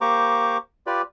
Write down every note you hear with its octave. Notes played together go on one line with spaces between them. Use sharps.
A#3 G4 C5 A#5 C#6 D6
F4 G4 B4 D5